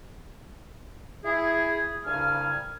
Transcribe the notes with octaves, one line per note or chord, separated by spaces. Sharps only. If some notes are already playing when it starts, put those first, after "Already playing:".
E4 G#4
C2 G2 C#3 F5 G#5 F6